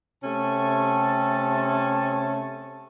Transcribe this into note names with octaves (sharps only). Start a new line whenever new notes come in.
C3 A3 C#4 A5